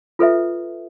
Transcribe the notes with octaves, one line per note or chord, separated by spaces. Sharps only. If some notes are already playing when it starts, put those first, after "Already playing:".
F4 A4 B4 E5